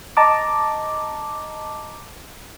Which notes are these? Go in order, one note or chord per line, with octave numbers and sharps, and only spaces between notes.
D#5 A5 A#5 D6